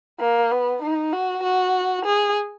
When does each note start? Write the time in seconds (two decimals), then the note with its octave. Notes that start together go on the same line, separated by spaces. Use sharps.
0.20 A#3
0.51 B3
0.82 D#4
1.13 F#4
1.43 F#4
2.05 G#4